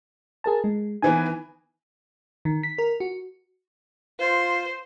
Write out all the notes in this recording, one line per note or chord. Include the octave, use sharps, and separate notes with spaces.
G#4 A#4 A5
G#3
D#3 E3 B3 G#5
D#3
B6
A#4
F#4
F4 C5